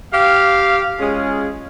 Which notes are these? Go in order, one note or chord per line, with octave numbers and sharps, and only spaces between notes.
G4 F5
G#3 C#4 F4 G#4